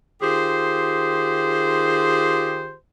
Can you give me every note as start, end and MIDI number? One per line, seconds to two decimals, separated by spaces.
0.22 2.74 51
0.22 2.74 65
0.22 2.74 67
0.22 2.74 68
0.22 2.74 72